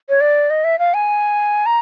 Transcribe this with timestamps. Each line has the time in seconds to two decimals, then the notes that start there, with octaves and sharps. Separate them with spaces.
0.09 C#5
0.21 D5
0.50 D#5
0.64 E5
0.79 F5
0.94 G#5
1.66 A#5